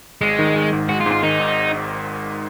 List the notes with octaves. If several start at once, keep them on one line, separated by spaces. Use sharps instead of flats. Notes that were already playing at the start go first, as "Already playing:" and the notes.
G#1 G#3
D#3
D#3
G#2
G#3 F#4
F4
G#2
F4
D#3 D#4
G#1